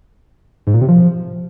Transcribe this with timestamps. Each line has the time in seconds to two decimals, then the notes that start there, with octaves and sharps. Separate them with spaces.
0.67 G#2
0.74 A#2
0.81 C3
0.88 F3